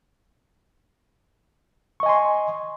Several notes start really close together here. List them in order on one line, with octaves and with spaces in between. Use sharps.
C#6 D#5 G#5 C6